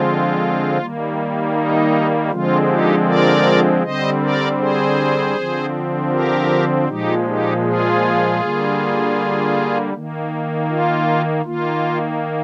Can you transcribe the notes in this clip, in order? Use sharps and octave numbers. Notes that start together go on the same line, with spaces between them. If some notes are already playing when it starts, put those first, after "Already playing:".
Already playing: D3 F3 G#3 C4 F4
D#3 G3 A#3
D#4
D3 F3 G#3 C4 F4
D#4 G4
A#4 D5
D3 G3 C4 C5 D#5
A#4 D5
G#4 C5
D3 F3 C4
G4 A#4
A#2 F3 G#3 D#4 G4
D#4 G4
F4 G#4
D3 G3 A#3
D#3 A#3
F4
D#3 A#3 F4